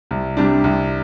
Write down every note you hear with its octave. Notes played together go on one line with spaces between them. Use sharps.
C2
C3 G3 D4
C2